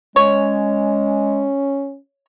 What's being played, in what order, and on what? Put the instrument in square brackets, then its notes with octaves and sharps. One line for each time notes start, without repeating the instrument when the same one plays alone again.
[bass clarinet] G#3 [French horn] C#4 [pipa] C#5